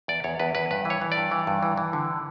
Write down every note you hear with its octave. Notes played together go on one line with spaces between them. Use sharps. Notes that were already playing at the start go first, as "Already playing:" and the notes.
E2 D5
E2 C#5
E2 B4
E2 B4
G2 B4
E3
C#5
E3
D5
G2
E3
G2
E3
E3
D3